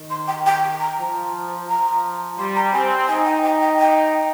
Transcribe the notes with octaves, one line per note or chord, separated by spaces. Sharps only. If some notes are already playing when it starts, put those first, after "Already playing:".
Already playing: D#3
C6
G5
G5
A#5
F3
F3 A#5
G3 C6
A#5
C4 G#5
D#4 G#5
G5
G5
G5
G5